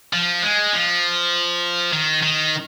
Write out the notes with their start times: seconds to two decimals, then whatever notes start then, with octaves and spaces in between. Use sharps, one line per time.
0.13 F3
0.42 G#3
0.73 F3
1.93 D#3
2.23 D#3